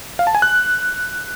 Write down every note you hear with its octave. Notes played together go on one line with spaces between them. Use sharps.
F5
A5
G#5
F#6